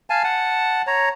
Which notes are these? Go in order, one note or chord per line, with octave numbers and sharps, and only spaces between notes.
F5 G#5 A5
F#5 A5
C#5 A#5